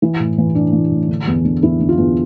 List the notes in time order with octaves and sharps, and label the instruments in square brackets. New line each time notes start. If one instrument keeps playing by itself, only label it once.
[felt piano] E3 E4
A2
E3
A2 D4
E3
A2
D3
E2
D3
E2 E4
D3
F4
E2